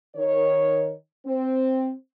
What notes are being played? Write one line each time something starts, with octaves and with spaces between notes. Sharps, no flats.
D#3 C#5
C4